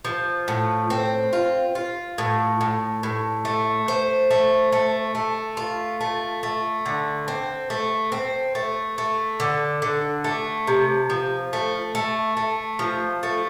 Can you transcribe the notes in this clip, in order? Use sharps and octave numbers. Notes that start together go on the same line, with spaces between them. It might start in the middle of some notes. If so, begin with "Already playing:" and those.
F3
A2
C4
F4
F4
A2
A2
A2
A3
C5
A3
A3
A3
F4
A3
A3
D3
C4
A3
C4
A3
A3
D3
D3
A3
C3
F3
A3
A3
A3
F3
A3